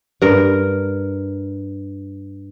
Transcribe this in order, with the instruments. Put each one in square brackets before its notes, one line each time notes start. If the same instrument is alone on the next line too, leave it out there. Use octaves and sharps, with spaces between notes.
[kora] G2 A#4